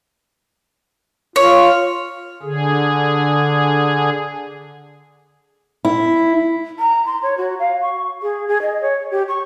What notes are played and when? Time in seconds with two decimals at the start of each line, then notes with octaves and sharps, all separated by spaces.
1.36 F4 C#5
2.43 D3 G#4
5.85 E4
6.79 A#5
7.06 C6
7.23 C#5
7.38 F#4
7.59 F5
7.82 C#6
8.22 G#4
8.48 G#4
8.62 D#5
8.81 C#5
9.11 G4
9.28 C#6